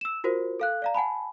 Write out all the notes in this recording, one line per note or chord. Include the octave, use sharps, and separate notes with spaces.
E6 E7
F4 F#4 A#4 C5
A4 F5 F#6
D5 F5 A#5
F#5 G#5 A5 B5